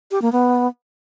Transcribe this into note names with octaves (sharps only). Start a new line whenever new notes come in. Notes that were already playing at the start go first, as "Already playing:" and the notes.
G4
A#3
B3